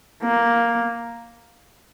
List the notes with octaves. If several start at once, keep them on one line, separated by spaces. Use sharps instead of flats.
A#3